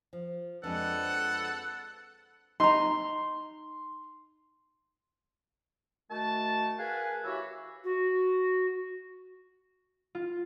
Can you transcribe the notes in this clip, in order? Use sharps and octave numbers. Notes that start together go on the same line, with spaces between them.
F3
F2 G#3 D4 A4 B4 F#5
D#4 A#5 C6
D#3 A3 F#4 A5
G#4 A#4 B4 F5 F#5 G#5
E3 F#4 G4 C#5 E5
F#4
F4